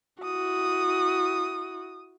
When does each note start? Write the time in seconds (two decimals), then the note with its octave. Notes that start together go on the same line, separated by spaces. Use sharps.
0.23 E4 F#4 D#6